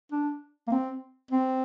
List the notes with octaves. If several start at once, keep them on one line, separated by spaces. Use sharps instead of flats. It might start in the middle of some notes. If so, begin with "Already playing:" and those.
D4
A#3
C4
C4